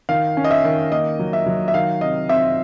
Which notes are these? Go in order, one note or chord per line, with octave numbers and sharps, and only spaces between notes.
D#3 F5
C#4
D#5
E5
D#3
A#3 D#5
F#3
E5
F#3
E5
D#3 F5
C3 D#5
C4 E5